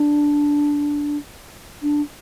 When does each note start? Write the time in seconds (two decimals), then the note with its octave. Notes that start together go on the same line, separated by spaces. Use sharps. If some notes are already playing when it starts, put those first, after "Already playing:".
Already playing: D4
1.82 D4